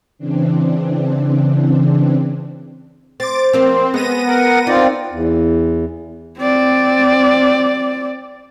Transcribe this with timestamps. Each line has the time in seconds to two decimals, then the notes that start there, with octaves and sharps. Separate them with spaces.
0.18 C#3 E3 C4 D4
3.20 C4 D6 A6
3.53 F3 A#3 C4
3.94 G#3 B3 A#6 D#7
4.26 A#4 F#5
4.67 C4 D#4 F4 D5
5.12 E2
6.39 C4 D5